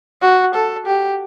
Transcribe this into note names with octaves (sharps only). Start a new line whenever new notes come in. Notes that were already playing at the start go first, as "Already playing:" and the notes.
F#4
A4
G4